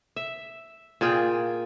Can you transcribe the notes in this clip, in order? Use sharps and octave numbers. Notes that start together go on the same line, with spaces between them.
E5
A#2 F4 G#4 G5